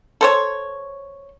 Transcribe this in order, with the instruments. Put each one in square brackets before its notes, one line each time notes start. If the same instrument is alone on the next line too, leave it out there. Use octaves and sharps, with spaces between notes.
[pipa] A4 C5 C#5